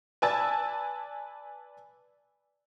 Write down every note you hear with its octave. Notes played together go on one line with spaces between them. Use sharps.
B4 D5 G#5 A5 E6 A6